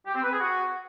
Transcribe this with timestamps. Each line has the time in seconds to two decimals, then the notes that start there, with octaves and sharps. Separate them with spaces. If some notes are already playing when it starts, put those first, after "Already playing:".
0.06 G4
0.15 C4
0.23 B4
0.32 G#4
0.40 F#4